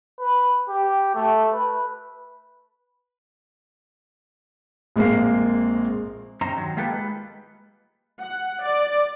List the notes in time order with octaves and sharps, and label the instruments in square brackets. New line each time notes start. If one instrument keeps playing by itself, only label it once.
[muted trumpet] B4
G4
A3
B4
[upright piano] A#1 G#3 A#3 C4 C7
[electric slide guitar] G2 C4 C#4 D#4 C5 A#5
D#3 F#3
G#3 A#3 F4 G4 A4 B4
G#3 B4
[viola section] F#5
D5